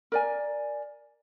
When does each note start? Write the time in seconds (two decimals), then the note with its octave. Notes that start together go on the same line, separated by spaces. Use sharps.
0.12 A#4 D5 G#5